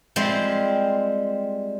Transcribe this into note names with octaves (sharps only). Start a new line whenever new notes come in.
F3 G3 G#3 C4